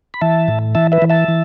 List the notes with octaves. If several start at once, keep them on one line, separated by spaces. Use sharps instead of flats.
B5
E3 E5 A5
A2
E3 E5 A5
B4 E5
E3
E5 A5
E3